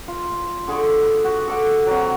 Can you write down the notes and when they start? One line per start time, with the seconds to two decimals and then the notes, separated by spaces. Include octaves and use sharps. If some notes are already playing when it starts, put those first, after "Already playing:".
0.08 F4
0.68 D3 G#4 D5 C#6
1.02 B4
1.24 F#4
1.48 A4 D5 F#5
1.86 C3 F#3